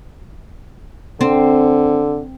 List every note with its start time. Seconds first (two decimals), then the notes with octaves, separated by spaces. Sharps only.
1.21 D3 C4